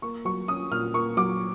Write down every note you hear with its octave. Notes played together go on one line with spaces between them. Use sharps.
A#3 C#6
F#3 C#6
C#4 D#6
A#2 F6
A#3 C#6
F#3 D6